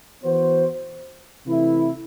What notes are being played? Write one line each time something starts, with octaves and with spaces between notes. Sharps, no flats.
E3 B3 F#4 C5
C3 E3 A3 E4